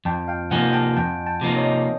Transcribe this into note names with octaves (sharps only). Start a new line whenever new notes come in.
F2 G5 A5
F5 G5
C3 F3 A#3 D#4 F#5 G#5
G5 A5
F2 G5 A5
G5 A5
C3 F3 A#3 D#4
C#5 D#5